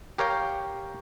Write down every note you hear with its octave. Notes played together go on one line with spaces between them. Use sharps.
G4 A#4 C#5 F5 G5